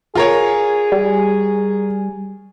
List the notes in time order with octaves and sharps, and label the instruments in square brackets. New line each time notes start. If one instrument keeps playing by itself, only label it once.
[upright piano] F4 A#4 C#5 [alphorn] G#4
[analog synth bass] G3